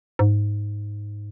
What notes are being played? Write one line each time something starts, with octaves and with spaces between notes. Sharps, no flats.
G#2